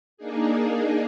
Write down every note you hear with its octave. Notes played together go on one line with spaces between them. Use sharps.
A#3 D4 D#4 G#4